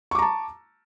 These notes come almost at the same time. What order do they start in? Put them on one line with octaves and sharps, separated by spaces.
C#6 D6 A#5 A5